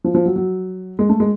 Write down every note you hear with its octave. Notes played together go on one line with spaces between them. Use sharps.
F3
F3
F#3
F#3
G#3
A3
G#3